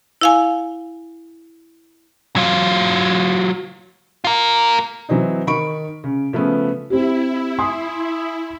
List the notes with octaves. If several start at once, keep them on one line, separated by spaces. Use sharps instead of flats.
E4 F5 G#5
F#3 F4
F4 A#4
E3 F#3 C4 D#4
D#3 B5 C#6 D7
C#3
C#3 F3 A3 B3
C4 E4 G4
G#5 C6 D#6